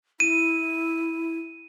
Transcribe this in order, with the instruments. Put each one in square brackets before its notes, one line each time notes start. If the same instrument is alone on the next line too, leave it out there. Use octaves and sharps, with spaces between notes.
[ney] E4 [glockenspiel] D#7